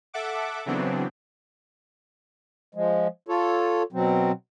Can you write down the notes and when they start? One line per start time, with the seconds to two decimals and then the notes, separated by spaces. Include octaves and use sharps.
0.14 A4 E5 F#5 D6
0.66 C#3 E3 F#3 B3 C4 D4
2.75 F3 G#3
3.28 F4 A4 C#5
3.93 B2 F#3 C4